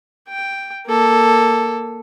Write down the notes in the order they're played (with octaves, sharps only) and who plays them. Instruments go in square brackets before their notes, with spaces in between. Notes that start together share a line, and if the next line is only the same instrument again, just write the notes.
[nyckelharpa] G5
A#3 A4